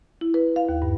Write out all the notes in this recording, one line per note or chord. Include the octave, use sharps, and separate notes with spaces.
E4
B4
F5
D#2
G2